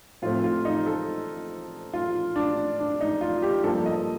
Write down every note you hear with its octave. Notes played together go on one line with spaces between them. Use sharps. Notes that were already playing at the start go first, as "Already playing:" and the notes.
A2 F3 A3 C4 F4
F4
D#4
A4
F4
D4
D4
D#4
F4
G4
G2 F3 A#3 A4
D#5